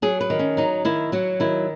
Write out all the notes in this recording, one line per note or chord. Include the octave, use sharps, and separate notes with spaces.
F#3 G#4
B4
D#3
C#4
F#3 D#4
D#3 E4
F#3 F#4
D#3 E4